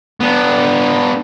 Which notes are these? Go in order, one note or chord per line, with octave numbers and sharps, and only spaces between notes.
B3 D4